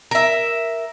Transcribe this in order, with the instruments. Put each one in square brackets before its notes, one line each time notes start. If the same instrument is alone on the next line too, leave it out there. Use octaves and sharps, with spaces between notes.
[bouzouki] A#4 E5